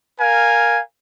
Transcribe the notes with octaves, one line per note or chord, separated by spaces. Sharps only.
A#4 F5 G#5